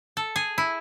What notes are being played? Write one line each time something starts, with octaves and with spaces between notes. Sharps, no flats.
A4
G#4
E4